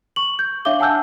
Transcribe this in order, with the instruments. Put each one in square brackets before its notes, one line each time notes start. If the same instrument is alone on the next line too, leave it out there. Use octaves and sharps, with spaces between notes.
[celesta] C#6 F#7
G6
D4 C#5 E5 F5 D6 G7
F#5 G#5 A5 E6 F6 G6